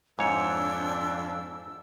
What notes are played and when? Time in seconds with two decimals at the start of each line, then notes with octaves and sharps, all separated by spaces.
0.19 F2 G#2 C4 D4 C#5 E6